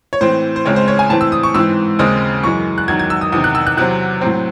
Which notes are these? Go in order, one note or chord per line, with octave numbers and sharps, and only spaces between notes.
C#5
A2 E3 C4 C5
C5
C#2 C#3 G#3 C4 C#5
C5
C#5
G#5
A2 E3 C4 A5
E6
D#6
C#6
G#2 E3 C4 E6
D#2 C#3 G#3 C4 D#6
F#2 E3 G#3 C#6
F#6
E2 D#3 F#3 G#6
G#6
E6
D#6
E2 C3 D#3 D#6
F#6
E6
F#6
E2 C3 F#3 C4 F#6
A2 F#3 C4